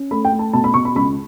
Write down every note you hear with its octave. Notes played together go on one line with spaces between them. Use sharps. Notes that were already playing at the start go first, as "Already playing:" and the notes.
Already playing: C#4
A3 B5
G5
A3
A5
B2 A5
B5
B2 C#6
B5
C#2 B5